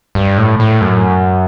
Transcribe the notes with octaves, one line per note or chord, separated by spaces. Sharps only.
G2
A2
A2
F#2